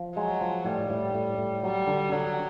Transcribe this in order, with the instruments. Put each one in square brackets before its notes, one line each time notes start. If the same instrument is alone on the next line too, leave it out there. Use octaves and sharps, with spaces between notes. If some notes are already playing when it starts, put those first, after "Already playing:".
Already playing: [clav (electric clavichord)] F3
[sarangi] F#3 [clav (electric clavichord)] G#3
[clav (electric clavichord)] F3
[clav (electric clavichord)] A2 [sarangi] G3
[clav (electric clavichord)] A2
A2
A2
[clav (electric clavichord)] F#3 [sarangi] G3
[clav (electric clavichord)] D3
[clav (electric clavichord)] D3 [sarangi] F#3